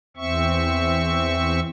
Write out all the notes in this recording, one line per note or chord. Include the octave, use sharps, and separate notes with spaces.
E2 C4 E5 C#6